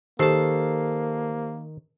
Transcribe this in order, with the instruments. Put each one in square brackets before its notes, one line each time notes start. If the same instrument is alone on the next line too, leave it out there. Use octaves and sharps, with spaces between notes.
[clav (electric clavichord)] D#3 [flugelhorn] A#3 [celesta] G4 C5 C7 [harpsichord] A4 A5